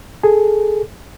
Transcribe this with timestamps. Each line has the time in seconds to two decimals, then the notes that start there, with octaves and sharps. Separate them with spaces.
0.23 G#4 A4